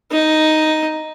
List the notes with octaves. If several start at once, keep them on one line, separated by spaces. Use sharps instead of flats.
D#4